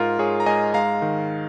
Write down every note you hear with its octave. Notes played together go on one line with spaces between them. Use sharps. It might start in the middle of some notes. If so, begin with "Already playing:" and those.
Already playing: G#2 F4 A#4
G#2 G#4 C#5
A#5
G#2 D#5 G#5
G#3 F5 A#5
D#3